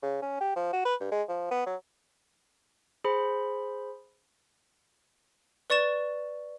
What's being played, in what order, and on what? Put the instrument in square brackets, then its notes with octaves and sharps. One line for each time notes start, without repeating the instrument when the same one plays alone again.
[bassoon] C#3
C#4
G4
F3
F#4
B4
G2
G#3
F3
B3
F#3
[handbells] G#4 C5 B5
[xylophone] B4 D5 C#6 A6 E7